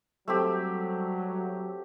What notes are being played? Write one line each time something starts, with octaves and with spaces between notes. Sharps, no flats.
F#3 G3 A3 C4 G4